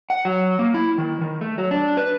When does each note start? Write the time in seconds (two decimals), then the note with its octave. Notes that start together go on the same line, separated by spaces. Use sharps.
0.10 F#5
0.25 F#3
0.59 A#3
0.74 E4
0.98 D#3
1.21 D#3
1.41 A3
1.58 F#3
1.71 D4
1.97 B4